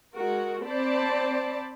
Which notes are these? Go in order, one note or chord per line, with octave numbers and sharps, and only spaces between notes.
G#3 F#4 A#4
C4 C5 D5 A5 B5